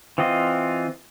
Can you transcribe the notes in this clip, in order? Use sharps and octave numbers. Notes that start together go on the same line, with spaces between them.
E3 C4 F4 D#5